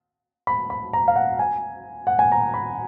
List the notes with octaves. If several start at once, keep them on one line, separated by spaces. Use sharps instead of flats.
B5
B5
A#5
F5
F#5
G#5
F#5
G#5
A#5
B5